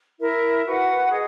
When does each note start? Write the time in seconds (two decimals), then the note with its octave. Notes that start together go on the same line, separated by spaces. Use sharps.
0.19 E4 A#4 E5
0.66 F#4 B4 F#5
1.10 G#4 D#5